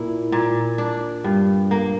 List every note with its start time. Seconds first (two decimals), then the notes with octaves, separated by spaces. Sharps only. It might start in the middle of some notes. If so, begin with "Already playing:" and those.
Already playing: A#2 E4
0.32 A#2
0.78 D4
1.24 G2
1.71 A#3